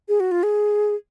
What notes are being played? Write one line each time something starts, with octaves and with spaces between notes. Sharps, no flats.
G#4
F#4
F4
G#4